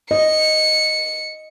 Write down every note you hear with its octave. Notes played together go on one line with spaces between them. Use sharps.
D#5 C#7